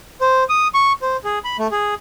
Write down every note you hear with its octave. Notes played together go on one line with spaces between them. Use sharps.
C5
D#6
C#6
C5
G#4
B5
A3
G#4